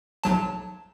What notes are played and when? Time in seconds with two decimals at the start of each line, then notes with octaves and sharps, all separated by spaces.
0.24 B1 F#3 A5